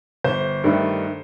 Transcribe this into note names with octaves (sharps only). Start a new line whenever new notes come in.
G1 C5
G2 D#3 A3 D4